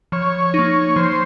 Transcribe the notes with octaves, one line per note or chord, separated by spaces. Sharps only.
F3 C#5
D#4
A#3
F3 C5